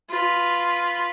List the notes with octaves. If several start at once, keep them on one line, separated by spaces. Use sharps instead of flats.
F4 B4